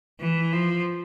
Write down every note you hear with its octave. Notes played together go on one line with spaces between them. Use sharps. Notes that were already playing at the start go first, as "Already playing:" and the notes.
E3
F3